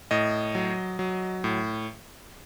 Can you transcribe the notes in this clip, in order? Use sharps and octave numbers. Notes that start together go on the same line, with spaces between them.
A2 D#5
F#3
F#3
A2